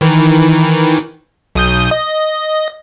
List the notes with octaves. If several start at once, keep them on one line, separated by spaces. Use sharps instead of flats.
D#3 E3
B1 D#6 G6
D#5